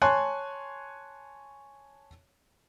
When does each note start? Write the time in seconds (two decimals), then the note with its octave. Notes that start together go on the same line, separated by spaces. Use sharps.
0.02 C#5 G#5 A5 C6 C#6 F#6